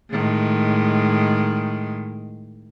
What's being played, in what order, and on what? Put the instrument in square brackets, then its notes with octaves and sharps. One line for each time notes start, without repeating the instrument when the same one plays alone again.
[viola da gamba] A2 D#3 G#3